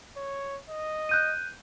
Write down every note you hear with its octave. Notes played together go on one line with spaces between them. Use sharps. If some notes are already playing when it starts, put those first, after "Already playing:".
C#5
D#5
F#6 G6 D#7